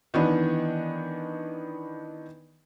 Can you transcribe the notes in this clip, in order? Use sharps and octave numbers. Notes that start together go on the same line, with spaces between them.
D#3 E3 B3 D4